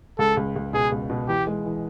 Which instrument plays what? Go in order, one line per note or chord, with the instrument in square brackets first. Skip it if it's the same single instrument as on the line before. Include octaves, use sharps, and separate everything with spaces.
[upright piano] C#2 [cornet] A4
[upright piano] C#2
C#2
[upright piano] B2 [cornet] G#4
[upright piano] C#2
B2
[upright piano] E3 [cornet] G4
[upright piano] G#3
E3